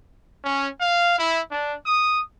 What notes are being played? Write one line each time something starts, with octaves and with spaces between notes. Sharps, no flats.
C#4
F5
E4
D4
D#6